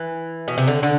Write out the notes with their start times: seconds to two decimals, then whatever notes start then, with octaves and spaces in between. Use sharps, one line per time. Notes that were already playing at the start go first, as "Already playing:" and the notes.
Already playing: E3
0.48 B2
0.58 C3
0.67 D3
0.83 D3